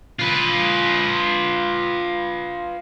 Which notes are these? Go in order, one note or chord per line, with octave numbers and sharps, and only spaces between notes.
F4 B4